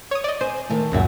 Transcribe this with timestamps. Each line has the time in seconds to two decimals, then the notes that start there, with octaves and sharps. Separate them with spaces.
0.11 C#5 D#6
0.24 D5 D#5
0.41 C5 G#5
0.69 D#3 A3
0.92 C#2 F#2 A#2 E5 F#5